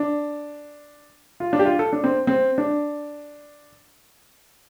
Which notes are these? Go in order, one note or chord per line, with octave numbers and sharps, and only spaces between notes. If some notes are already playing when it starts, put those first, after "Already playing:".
Already playing: D4
F4
D4
G4
F4
A4
D4
C4
C4
D4